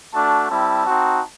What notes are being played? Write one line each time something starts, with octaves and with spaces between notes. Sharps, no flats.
A3 D4 F#4 A5
G3 C4 E4 A5
C4 D#4 F#4